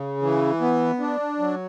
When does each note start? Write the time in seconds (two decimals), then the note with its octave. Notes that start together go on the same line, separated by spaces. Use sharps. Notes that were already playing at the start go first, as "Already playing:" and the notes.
Already playing: C#3
0.22 E3
0.61 B3
1.00 D4
1.39 F#3